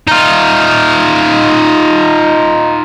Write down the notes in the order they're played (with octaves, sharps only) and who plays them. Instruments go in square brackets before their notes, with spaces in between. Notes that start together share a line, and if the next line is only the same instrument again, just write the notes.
[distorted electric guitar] D#4 F4